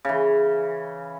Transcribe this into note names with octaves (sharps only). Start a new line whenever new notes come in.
C#3 E3